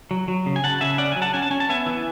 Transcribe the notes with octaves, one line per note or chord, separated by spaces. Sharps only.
F#3
F#3
C#3
G#5
C#3 F#5 A5
C#3 E5 G#5
C#4 D5 F#5
F#3 G#5
F#5 A5
C#4 G#5
A5
C#4 G#5
A5
B3 E5 G#5
E3